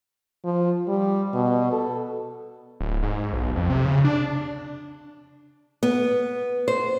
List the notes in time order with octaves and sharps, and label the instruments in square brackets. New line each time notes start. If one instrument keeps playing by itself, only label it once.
[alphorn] F3
G3
B2
A4
[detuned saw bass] D1
G#2
B1
F2
C3
C#3
D4
[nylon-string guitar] B3
C5